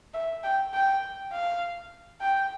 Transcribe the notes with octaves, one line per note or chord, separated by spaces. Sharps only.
E5
G5
G5
F5
G5